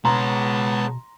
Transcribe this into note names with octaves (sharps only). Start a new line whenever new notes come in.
B2 G#3 B3 C#5 A5 A#5 C6